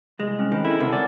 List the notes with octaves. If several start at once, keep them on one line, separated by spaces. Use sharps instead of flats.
C2 G#3
C4 C#4
D#3 D#5 B5
E4 A4
C#2 C3 A#4 F#5 A5
C#5 D5 F#5 G#5